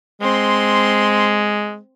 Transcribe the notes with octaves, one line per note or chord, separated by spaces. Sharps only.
G#3 C4 C6